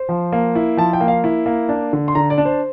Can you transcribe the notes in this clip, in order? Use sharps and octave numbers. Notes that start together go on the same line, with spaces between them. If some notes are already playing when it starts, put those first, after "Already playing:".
Already playing: C5
F3
A#3
E4
F3 A5
G5
A#3
F5
E4
A#3
D4
D3
C6
D3 A#5
D5
D4
C5